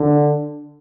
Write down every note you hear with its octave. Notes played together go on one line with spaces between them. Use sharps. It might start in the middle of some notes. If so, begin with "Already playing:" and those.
Already playing: D3